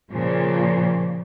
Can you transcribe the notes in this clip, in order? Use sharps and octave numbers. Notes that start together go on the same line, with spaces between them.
A#2 C#3 F3